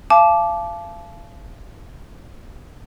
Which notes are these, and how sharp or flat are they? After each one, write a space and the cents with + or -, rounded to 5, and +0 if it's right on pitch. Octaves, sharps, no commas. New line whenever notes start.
F5 -35 A5 -30 D6 +0